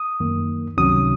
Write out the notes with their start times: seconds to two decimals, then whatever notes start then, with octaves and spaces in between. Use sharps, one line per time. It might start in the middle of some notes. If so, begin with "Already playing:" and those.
Already playing: D#6
0.20 F#2 D#3 A#3
0.77 C#2 C3 D#3 F#3 C#4 D#6